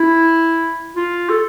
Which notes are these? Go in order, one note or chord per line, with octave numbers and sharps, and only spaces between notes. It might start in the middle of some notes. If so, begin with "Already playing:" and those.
Already playing: E4
F4
A4